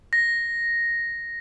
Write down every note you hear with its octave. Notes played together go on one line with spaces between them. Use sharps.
A#6